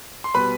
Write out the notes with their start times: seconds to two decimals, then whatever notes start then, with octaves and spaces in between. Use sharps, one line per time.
0.24 C6
0.34 B2 G3 B4 B5